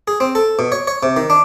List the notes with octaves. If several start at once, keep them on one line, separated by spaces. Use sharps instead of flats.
G#4
C4
A4
B2
C#5
C#5
C3
D#3
D4